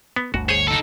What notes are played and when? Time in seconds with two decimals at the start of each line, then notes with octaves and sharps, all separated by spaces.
0.16 B3
0.34 G1 D2 F#4
0.49 G#4 C5 C#5
0.68 D#4 A4